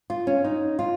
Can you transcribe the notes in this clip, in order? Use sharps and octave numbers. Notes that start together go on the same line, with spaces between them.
F4
C#4
D#4
F4